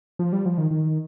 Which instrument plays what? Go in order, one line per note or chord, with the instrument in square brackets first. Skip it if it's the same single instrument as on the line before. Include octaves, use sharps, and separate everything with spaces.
[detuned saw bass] F3
G3
F3
D#3
D#3